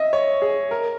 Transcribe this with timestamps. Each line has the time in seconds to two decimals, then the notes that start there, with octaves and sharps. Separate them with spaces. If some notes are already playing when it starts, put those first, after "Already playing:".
Already playing: D#5 E5
0.13 C#5
0.42 G#4
0.71 A#4